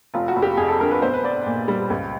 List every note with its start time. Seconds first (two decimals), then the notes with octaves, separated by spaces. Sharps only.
0.14 F1 F4
0.28 F#4
0.36 F1
0.42 G4
0.57 F2 G#4
0.68 A4
0.80 D3 A#4
0.91 B4
1.02 B1 C5
1.13 B4
1.23 B3 D5
1.46 A#2
1.68 G3
1.90 C#2